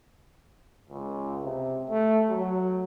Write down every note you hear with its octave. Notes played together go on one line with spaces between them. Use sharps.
C#2
C3
A3
F#3